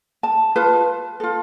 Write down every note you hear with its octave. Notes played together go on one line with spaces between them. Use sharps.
A5
F4 B4 A5
F4 A4